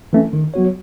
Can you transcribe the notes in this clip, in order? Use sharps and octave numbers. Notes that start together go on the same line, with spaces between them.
E3 A3 C#4
D#3
F#3 B3 F#4 C#5